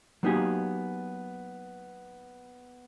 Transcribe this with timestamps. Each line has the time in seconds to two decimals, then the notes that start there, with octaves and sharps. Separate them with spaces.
0.23 F#3 A#3 B3 D#4 G4 G#4